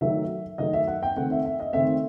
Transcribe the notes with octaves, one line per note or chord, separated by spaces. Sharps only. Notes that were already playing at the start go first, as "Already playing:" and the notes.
D#3 F#3 A3 E5
D#3 F#3 A3 D#5
E5
F#5
G5
D#3 A3 C4 F#5
E5
E5
D#5
D#3 A3 C4 E5